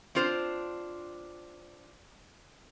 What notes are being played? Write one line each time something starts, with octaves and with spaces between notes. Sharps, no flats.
C4 D4 F4 C5